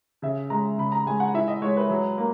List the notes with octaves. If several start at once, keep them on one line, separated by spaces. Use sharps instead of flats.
C#3 E5
G#3 A#5
C#3 B5
A#5
G#3 G#5
F#5
E4 E5
D#5
G#3 C#5
B4
F#3
A#3